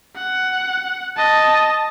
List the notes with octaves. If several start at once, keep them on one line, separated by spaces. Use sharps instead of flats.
F#5
D#5 A5